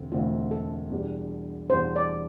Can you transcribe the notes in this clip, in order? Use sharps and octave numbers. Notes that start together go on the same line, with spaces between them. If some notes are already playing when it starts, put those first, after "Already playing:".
Already playing: E1 D2 C4
E1 D2 D3 A3 C4 F4
A4
E2 B2 G3 D4
E2 B2 G3 D4 C5
D5